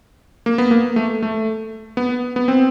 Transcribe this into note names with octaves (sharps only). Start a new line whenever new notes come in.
A#3
B3
A#3
A3
A3
B3
B3
C4